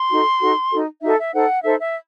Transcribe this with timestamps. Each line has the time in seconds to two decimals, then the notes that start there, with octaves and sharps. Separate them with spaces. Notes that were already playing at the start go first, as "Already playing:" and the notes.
Already playing: C6
0.10 D#4 F#4 A4
0.41 D#4 F#4 A4
0.72 D#4 F#4 A4
1.02 D#4 F#4 A4 E5
1.18 E5
1.33 D#4 A4 C5 F#5
1.63 D#4 A4 C5 E5
1.78 E5